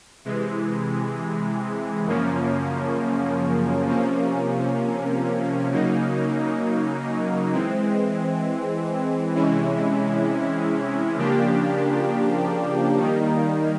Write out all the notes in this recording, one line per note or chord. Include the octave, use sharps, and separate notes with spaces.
C3 E3 G#3
F#2 C#3 F3 A#3 C#4
C3 F3 A#3 C#4
C#3 F#3 A#3 D#4
E3 G#3 C4
C3 E3 G#3 C#4 E4
C#3 F3 A#3 D4 G4
D#3 G3 A#3 D#4